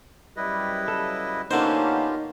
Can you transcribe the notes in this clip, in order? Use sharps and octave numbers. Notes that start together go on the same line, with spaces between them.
F#2 G3 E4 B4 D#5
C#3 F#3 G3 A4
D3 A#3 B3 C#4 D#4 F4 G4 C5